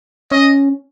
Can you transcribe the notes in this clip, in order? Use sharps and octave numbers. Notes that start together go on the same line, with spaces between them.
C#4 D#5